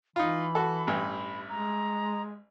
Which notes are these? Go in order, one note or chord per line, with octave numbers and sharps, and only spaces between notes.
E3 D#4 F4 B5
F#4 A4
A1 G2
G#3 A#5